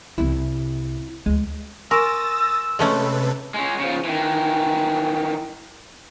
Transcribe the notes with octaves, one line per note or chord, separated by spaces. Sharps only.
C2 C3 E4
D2 G#3
A#4 G#5 C6 C#6 D#6 E6 A6 A#6
C3 G#3 A3 C#4 A4 B4
G#3 C#4
C#3 F3
D#3 E3